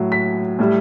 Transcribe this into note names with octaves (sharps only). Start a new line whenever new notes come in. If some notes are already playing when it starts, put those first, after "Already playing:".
Already playing: A2 F#3
B6
A2 G3